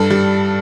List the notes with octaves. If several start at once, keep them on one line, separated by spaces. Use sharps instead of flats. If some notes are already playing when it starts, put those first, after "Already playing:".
Already playing: G2 A4
G3